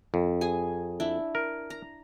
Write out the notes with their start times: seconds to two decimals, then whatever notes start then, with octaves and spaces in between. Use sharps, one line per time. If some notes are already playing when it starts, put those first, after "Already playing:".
0.14 F2
0.41 G#4 G#5
1.00 D4 E4
1.35 A#4
1.70 A#5